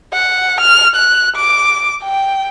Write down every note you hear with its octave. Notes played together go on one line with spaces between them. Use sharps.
F#5
F6
F#6
D6
G5